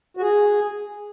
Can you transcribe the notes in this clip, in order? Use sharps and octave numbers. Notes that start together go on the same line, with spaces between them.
F#4
G#4